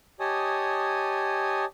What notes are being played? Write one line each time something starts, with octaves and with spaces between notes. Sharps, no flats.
G4 C#5 D#5 G#5 A5 D#6